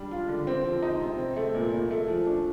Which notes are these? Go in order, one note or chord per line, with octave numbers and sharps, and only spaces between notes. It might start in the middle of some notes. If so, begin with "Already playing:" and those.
Already playing: G3 D4
F4
D3
C4
F3
D#4
C3
C4
A3
A#2
A#2
A3
F3
D4